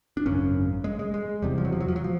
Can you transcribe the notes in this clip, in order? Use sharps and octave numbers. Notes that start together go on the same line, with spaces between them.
D4
G#1 F#2 C#3 C#4
G#3
G#3
G#3
E1 E2 C3 G3
F3
F#3
F3
F#3
F3
F#3
F3